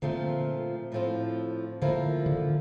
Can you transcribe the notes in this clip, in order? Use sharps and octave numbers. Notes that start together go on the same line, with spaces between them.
A#2 D3 F3 A3 C4
A2 F3 C4
D3 F3 A#3 E4 A#4
D3